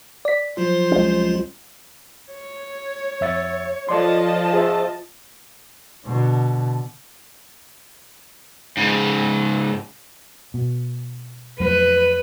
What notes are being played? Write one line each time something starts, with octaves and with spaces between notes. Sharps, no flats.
D5 B6
F3 F#3 F4 C5
C2 G#3 C#4
C#5
F2 E5 A6
F3 A4 D5 D#5 A5 C6
G#4 C5 E5
B2 D3
G#2 C#3
B2
F2 F#3 A3 B4